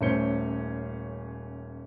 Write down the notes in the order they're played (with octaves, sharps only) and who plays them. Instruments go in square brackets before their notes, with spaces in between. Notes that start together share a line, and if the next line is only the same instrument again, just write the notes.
[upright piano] D#1 A3 C#4 C5 C#7 G7